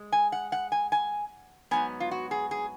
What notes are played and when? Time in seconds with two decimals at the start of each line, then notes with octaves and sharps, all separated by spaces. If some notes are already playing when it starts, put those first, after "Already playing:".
Already playing: G#3
0.12 G#5
0.32 F#5
0.52 F#5
0.72 G#5
0.92 G#5
1.71 G#2 F#3 B3 G#5
2.00 F4
2.11 F#4
2.31 G#4
2.51 G#4